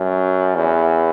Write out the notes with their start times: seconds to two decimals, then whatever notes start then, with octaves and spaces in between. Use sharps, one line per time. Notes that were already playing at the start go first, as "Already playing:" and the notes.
Already playing: F#2
0.55 E2